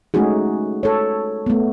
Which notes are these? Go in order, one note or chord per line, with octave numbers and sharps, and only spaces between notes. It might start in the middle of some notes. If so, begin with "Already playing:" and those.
G#3 A3 C#4 D#4 F#4 G#4
A4 C#5
A3 B3